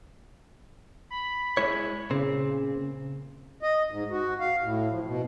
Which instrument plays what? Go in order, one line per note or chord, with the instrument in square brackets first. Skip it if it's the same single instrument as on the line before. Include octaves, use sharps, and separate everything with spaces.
[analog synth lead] B5
[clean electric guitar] G#3 E4 C#5
[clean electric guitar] A#2 C4 [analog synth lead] C#3
[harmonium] D#5
G#2
F#4
F5
A2
F3
B2